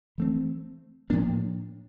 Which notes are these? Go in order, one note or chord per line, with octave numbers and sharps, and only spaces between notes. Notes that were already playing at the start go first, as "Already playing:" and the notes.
E3 A3 C4
A2 F3 A#3 D4